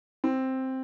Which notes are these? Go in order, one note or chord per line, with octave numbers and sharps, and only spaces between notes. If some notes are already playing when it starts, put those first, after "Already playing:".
C4